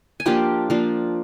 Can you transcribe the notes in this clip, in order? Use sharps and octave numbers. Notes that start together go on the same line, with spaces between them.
G#5
F3 A#3 D4 F4 G4 G5
F3 A#3 D4 F4